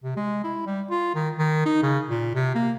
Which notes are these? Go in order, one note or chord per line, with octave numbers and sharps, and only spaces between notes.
C3
G#3
E4
G3
F4
D#3
D#3
D#4
C#3
A#2
C3
A#3